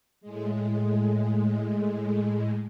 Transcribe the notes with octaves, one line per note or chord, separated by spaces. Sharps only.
A2 G#3